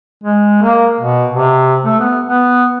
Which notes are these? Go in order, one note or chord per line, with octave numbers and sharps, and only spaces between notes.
G#3
A#3
B2
C3
A3
B3
B3